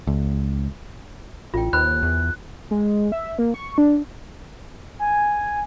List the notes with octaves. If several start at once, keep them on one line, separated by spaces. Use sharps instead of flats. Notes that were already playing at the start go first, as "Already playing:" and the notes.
C#2
A1 F4 G5
D#2 B4 C5 B5 F#6
E2
G#3
E5
A#3
C#6
D4
G#5